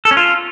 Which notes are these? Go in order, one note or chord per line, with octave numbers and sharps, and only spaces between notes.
A4
C#4
F4